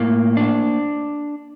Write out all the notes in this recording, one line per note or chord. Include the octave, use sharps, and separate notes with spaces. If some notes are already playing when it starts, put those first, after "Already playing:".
Already playing: A2 A#3
D4